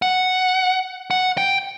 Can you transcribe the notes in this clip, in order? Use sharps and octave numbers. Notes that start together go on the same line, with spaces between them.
F#5
F#5
G5